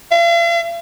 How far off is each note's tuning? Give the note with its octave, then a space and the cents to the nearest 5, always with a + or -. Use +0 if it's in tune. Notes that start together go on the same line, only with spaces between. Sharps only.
F5 -45